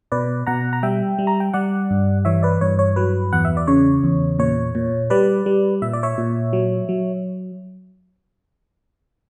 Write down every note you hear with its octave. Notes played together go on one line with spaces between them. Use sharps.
B2 B4 D5
B2 F#5 A#5
A#5
G3 E5 G5
G3
A#5
G5
G3 D5 F#5
G2
E3 C#5 E5
B4 D5
G2 C#5
C#5
F#3 B4
E2 F#5
E5
D5
C#3 C#5
E2
A#2 C#5
A#2
G3 B4 D5
G3
A#2 E5
D5
C#5 E5
A#2
F#3
F#3